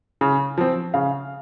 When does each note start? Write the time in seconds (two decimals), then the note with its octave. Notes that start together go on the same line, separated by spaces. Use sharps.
0.21 C#3
0.58 F3 C4
0.94 C#3 F5